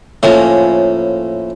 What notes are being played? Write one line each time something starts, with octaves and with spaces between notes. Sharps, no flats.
A2 F3 A#3 C#4